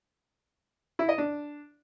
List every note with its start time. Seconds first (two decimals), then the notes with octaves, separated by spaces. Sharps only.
0.99 E4
1.09 D#5
1.18 D4